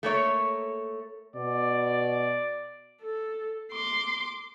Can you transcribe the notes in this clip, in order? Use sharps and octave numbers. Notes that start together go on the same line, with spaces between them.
A3 A#3 C#5
B2 D5
A4
C6 D6